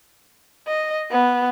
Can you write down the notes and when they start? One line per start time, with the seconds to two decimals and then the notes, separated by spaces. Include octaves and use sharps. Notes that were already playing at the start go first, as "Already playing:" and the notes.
0.68 D#5
1.11 B3